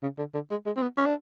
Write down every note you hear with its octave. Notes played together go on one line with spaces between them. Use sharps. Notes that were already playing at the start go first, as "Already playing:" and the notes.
C#3
D3
D3
G#3
G#3
C4
B3
C#4
D4